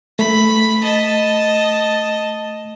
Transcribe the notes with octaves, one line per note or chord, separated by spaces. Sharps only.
A3 B5
D#5 A5